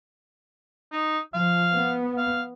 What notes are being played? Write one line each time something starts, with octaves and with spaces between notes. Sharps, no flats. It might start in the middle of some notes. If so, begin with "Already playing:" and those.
D#4
F3 F5
B3
F5